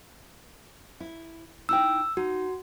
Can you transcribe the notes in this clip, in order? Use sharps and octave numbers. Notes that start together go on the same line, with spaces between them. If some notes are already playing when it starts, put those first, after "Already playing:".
E4
D#4 E4 G5 E6
D#4 F#4